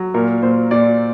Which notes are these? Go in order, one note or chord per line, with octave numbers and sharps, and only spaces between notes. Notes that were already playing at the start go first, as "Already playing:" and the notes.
Already playing: F#3
A#2 A#4
A#2 C5
A#2 D5